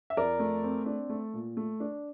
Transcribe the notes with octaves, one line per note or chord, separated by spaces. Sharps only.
E5
F2 A#4 D5
A3
C4
D4
A3
A#2
A3
D4